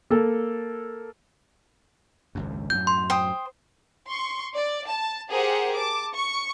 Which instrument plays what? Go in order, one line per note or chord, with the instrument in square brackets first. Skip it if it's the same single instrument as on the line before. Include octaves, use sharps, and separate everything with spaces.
[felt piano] A#3 A4
[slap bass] G#1 C#2 F#2
[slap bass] F#2 A2 F#3 [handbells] G6
[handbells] C6
[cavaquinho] C5 G5 D#6
[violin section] C6 C#6
D5
A5
G4 G#4 A#4 C5 F#5
A5 D6
C#6